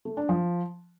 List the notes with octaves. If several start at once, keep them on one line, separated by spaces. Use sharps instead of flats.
A3
D4
F3